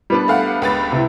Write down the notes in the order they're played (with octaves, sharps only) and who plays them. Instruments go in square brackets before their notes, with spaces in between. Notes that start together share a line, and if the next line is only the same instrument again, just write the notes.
[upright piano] G3 B3 D4
[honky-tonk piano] A3 F5 F#5
C#2 B4 A6
[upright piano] C3 E4